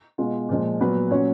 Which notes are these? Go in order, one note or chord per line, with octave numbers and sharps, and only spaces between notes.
B2 G#3 F4
A#2 F3 G#3
A#2 F#3 B3 B4
A#2 F#3 C#4 C#5